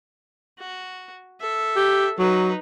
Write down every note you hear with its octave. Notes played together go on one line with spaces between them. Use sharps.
F#4
A4 E5
G4
F#3 D#4 B4